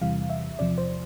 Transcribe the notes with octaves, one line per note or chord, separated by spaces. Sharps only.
E2 C3 E3 G3 F5
E5
E2 C3 F3 D5
C5